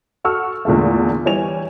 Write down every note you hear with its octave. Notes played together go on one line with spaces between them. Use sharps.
F#4 A4 C#6 E6 F6
E2 A#2 D3 G#3 A3
E3 G3 C#5 G#5 F7